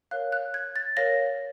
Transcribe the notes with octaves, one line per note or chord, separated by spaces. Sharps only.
A#4 C#5 F5 F#6
F#6
G#6
A6
A#4 C#5 F5 A#6